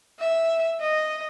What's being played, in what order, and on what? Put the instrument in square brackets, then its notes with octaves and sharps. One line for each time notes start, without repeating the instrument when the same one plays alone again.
[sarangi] E5
D#5